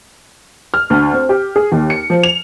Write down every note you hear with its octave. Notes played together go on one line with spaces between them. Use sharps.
F6
D2
C4
G4
G#4
D#2
C#7
F3
F7